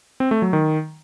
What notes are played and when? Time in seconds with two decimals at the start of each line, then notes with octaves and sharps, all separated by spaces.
0.20 C4
0.31 A3
0.42 F#3
0.53 D#3